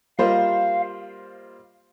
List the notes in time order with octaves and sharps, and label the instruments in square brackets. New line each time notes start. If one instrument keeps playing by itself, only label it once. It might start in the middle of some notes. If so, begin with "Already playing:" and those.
[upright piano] G3 A#3 F4 C5 D#5 [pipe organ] F5